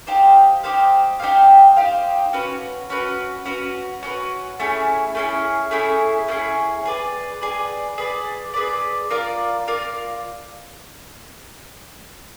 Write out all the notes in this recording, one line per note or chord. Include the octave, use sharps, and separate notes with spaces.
D#4 G4 C5 F5
D#4 G4 C5 F5
D#4 G4 C5 F5
D#4 G4 C5 F5
C#4 F#4 B4
C#4 F#4 B4
C#4 F#4 B4
C#4 F#4 B4
A3 C#4 E4 G#4
A3 C#4 E4 G#4
A3 C#4 E4 G#4
A3 C#4 E4 G#4
G#4 B4 D5
G#4 B4 D5
G#4 B4 D5
G#4 B4 D5
F4 A#4 D5 F5
F4 A#4 D5 F5